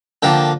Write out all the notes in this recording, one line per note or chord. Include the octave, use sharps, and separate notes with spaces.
D3 F3 A#3 G5